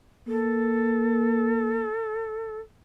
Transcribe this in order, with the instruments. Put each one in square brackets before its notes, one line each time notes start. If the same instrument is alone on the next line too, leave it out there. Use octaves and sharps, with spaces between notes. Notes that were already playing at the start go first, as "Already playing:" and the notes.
[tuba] A#3 [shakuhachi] A4